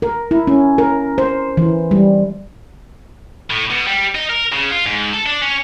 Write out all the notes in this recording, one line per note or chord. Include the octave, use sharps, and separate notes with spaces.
A#4
E4
C#4
A#4
C5
E3
G3
A2
B2
G3
D#4
A#4
C#3
F4
G#2
A4
D4
C#4